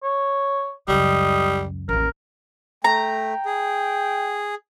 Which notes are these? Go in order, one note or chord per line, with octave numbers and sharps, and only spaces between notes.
C#5
C#2 F#2 G3 D#5
A1 D#2 A#4
A3 G5 A#5
G#4